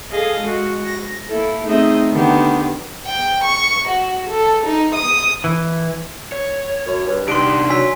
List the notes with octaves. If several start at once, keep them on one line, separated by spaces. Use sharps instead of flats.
G#4 A4 D#5 F5
G#3 F#4
A#6
A#3 E4 A4
A3 C4 D#4 G#4 D#5 E5
D3 D#3 B3 G4
G5
C#6
F#4
A4
D#4
D#6
E3
C#5
F#2
G2
C3 D4 D#4 G4 C6 D7
F#3 G#5 E6 B6